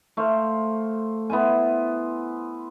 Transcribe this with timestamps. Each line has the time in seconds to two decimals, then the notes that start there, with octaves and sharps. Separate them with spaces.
0.17 A3 C5 F5
1.30 B3 E4 C5 G#5